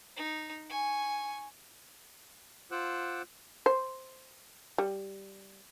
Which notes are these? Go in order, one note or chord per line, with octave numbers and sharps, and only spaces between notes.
D#4
G#5 C#6
F4 C5 F#5 D6 E6 F#6
C5
G3